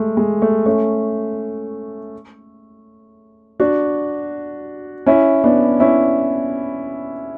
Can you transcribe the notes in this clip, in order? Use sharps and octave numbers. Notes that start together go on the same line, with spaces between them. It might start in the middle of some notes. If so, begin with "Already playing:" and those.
Already playing: G#3 A3
G#3
A3
A3 C#4
D4 F#4
C#4 E4
B3 D4
C#4 E4